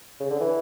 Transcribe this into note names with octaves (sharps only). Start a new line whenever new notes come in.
C#3
D3
E3